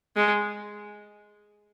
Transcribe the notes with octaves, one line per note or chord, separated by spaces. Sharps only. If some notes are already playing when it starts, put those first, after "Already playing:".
G#3